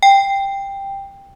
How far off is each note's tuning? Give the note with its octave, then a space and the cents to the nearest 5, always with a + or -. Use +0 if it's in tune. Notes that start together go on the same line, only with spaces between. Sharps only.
G5 +10